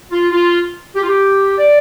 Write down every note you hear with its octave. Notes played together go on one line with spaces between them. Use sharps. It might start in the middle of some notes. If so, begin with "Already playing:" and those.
F4
F4
G4
F4
G4
D5